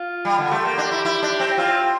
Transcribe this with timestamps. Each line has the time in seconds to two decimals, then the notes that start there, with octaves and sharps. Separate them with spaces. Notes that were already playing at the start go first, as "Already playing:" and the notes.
Already playing: F4
0.25 G3
0.38 D3
0.51 A3 G4
0.65 A#3
0.78 D4
0.91 E4
1.05 E4
1.22 D4
1.40 C4
1.58 C4 F4